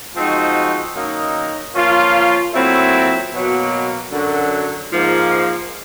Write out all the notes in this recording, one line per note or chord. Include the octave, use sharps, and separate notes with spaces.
F3 G#3 C4 D#4 F#4
F#2 D#3 F#3 A#3 D#4
F3 A#3 C#4 F4
A#2 F#3 A3 C4 E4
B2 F#3 A#3
F#2 D3 F#3
G#2 F3 A#3